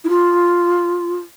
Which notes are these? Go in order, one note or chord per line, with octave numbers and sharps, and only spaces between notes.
E4
F4